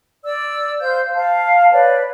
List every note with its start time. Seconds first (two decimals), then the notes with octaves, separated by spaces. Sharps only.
0.24 D5 E6
0.81 C5 F5 G6
1.15 F5 A5
1.72 B4 C#5 D5